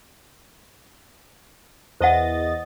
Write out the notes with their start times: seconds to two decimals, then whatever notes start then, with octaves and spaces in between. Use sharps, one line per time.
2.01 E2 C5 D#5 F#5 A6